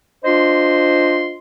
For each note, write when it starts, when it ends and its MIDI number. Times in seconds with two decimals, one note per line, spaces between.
0.24 1.37 62
0.24 1.37 65
0.24 1.37 72
0.24 1.37 75
0.24 1.37 84